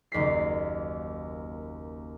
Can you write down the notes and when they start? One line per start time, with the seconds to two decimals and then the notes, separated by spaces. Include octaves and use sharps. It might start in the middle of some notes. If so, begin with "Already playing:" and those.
0.12 F#1 D#2 B6 C7